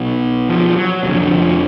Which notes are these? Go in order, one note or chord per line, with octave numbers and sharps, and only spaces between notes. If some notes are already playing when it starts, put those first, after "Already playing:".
Already playing: B1 B2
F3
F#3
F1 F2 D3 F#3
F3